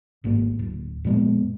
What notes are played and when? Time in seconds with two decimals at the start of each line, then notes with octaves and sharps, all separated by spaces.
0.24 G#1 G#2 A#3
0.59 D1
1.05 F2 A#2 G#3 B3